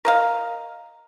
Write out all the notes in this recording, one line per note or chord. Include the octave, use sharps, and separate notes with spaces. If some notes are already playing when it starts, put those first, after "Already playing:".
A#4 D#5 F5